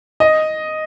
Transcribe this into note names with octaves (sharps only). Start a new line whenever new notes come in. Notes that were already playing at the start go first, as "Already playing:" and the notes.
D#5